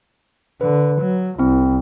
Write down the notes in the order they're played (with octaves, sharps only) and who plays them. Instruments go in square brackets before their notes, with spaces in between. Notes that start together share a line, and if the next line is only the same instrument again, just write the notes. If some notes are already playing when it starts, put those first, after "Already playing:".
[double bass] D3 [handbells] B4
[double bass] F#3
[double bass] C2 [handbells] C4 E4